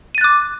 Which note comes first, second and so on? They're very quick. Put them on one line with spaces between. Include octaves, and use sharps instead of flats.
D#7 A6 F#6 D6